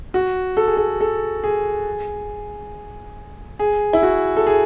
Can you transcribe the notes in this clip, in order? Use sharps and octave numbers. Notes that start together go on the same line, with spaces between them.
F#4
A4
G#4
A4
A4
G#4
G#4
E4
F#4
A4
G#4